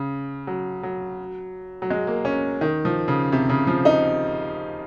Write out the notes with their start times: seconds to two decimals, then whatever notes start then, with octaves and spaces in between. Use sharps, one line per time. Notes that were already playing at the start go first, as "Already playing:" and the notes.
Already playing: C#3
0.47 F#3
0.83 F#3
1.82 F#3
1.90 G#3
2.07 A#3
2.25 C#4
2.61 D#3
2.85 F3
3.08 C#3
3.32 C3
3.49 C#3
3.67 F3
3.85 D#4